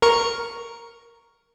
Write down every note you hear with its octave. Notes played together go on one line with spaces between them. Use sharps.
A#4 C#6 C#7